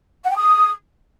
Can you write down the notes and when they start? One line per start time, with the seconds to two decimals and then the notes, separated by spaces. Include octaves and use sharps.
0.24 F#5
0.30 G5
0.37 D#6